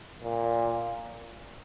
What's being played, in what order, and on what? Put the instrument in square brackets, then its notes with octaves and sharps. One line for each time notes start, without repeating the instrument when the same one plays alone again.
[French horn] A#2